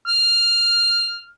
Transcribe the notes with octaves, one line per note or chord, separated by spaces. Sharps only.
F6